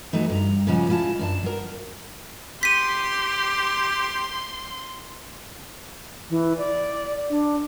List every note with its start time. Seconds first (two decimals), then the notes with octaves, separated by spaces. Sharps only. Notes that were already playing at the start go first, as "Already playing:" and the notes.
0.13 E3 F#3 A3 D#4
0.30 G2 A#5
0.67 A#2 C#3 F3 G#3 C#4 F#4
0.89 G#3 E4 F4 G#5 A5
1.19 F#2 D4 A5
1.43 F#3 A#4
2.63 G4 C6 B6 D#7
6.30 E3
6.57 D5
7.30 D4